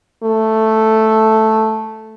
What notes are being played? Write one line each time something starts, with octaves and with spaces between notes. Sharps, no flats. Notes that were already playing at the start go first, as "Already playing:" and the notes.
A3